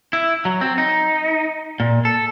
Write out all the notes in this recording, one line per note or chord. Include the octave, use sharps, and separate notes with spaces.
E4
F#3
C4
D#4
A#2
A4